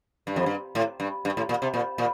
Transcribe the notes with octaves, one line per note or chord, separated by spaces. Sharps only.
G2
F2
G2
A2
G2
G2
A2
A#2
C3
A#2
A#2